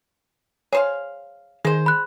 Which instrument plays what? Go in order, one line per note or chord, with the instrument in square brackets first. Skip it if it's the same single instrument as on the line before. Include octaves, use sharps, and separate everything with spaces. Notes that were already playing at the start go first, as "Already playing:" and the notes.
[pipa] G#4 C5 F5 [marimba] C#5
[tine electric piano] D#3 [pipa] G#3 C5 [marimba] G#4
[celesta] B5 F#6